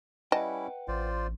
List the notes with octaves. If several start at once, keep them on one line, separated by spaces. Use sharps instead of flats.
G3 C#4 E4 B4 D#5 F#5 G5 A5
A1 F4 C5 D5